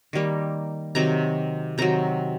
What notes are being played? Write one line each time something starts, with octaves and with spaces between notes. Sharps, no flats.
D#3 G3 A#3
C3 D#3 F#3 A#5
C3 D#3 F#3 A#5